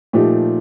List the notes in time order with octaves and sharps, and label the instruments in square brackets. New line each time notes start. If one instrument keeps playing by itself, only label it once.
[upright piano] A#2 F3 A3 D#4 G4